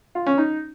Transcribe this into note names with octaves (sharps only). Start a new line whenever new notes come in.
F4
C#4
D#4